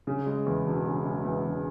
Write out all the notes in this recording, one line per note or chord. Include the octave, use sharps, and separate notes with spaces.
C#3
G#3
E2
E1
C#3
G#3
E2
E1